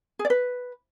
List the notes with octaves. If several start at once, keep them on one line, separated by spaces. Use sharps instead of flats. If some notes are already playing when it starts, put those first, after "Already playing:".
G#4
D5
B4